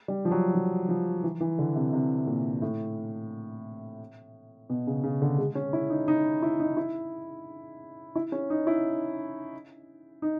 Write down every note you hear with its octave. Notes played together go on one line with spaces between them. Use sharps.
G3
F3
F#3
F3
F3
E3
E3
D3
C3
C3
A#2
A2
B2
C#3
C#3
D3
G#3
C#4
E4
D#4
D#4
E4
D#4
E4
E4
C#4
D#4
E4
D#4